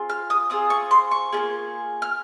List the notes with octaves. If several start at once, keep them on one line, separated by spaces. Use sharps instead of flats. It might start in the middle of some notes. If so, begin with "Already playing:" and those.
Already playing: C4 F4 G#4
F6
D#6
C4 F4 G#4 D#6
C#6
C6
C#6
A#3 C#4 F4 G#4
F6